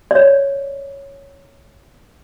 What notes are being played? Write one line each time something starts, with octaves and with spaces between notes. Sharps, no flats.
C#5 D5